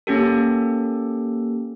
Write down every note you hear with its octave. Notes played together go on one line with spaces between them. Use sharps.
A#3 C#4 G4 A4